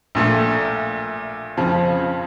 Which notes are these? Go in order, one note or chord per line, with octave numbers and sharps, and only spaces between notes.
A#1 A#2 A3
F2 C#3 F3